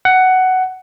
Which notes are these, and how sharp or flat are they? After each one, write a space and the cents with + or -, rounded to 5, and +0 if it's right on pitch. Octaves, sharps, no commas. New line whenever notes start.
F#5 +10